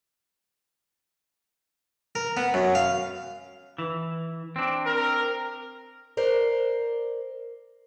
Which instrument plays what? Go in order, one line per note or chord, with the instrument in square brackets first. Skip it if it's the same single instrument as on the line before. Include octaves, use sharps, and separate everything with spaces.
[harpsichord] A#4
B3
F#2
F5
[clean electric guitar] E3
C4 D4
[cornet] A#4
[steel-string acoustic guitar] A#4 C5 D5